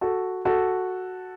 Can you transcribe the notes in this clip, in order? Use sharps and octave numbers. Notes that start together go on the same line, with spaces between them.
F#4 A4
F#4 A4